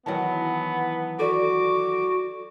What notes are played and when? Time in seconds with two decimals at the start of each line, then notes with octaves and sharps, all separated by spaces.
0.06 D#3 E3 F#3 B3 A5
1.19 F#4 A4 D5 D6